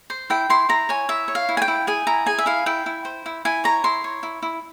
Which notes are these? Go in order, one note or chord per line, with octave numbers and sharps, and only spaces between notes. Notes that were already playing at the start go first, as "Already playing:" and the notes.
C5
E4 G5
E4 C6
E4 A#5
C#5 G#5
E4 E5
C#5
F5
E4
G#5
G5
E4
G#4 G#5
E4 A#5
G#4 G#5
E5
E4 F5
E4 G5
E4
C5
E4
E4 G#5
C#5 A#5
E4 C6
C#5
E4
E4